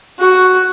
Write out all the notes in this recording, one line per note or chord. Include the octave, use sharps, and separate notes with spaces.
F#4